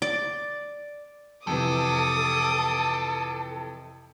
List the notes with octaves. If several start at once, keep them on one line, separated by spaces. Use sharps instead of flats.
D5
F2 C3 E3 A4 D6 D#6